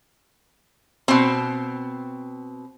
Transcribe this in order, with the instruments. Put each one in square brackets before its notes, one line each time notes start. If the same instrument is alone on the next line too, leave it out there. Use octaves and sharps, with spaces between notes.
[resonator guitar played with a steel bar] B2 C4